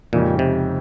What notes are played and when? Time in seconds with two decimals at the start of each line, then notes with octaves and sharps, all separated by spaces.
0.13 F2 A#2 C#3 G#3 D#4 G4
0.39 C3